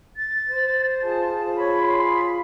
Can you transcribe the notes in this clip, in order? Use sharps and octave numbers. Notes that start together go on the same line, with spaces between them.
A6
C5
F4 G#4 A5
C#5 B5
C6